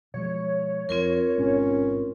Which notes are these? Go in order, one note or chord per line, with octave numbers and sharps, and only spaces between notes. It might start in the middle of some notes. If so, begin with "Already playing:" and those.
B2 F3 G#3 C#5
F2 C4 F4 A#4
A1 G#2 B2 C#4